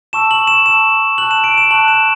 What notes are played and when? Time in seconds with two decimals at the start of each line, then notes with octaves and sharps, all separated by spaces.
0.13 A5 C#6 E6 E7
0.31 F#7
0.47 E7
0.66 A5 C#6 E6 E7
1.18 A5 C#6 F#6 F#7
1.31 E7
1.44 D7
1.58 E7
1.71 A5 C#6 F#6 F#7
1.88 E7